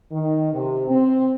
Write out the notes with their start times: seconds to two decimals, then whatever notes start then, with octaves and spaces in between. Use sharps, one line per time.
0.12 D#3
0.53 C3
0.88 C4